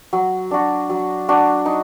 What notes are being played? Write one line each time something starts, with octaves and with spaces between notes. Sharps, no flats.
F#3
D4 F#4
F#3
D4 F#4
D#4